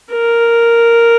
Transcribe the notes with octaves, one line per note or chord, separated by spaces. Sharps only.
A#4